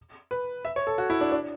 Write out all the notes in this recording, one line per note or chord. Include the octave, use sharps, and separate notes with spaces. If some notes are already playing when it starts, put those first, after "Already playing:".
B4
E5
C#5
A4
F#4
E4
D4
D4